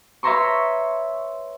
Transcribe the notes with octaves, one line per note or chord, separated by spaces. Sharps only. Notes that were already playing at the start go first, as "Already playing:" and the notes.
B4 C#5 E5 A#5 C6 C#6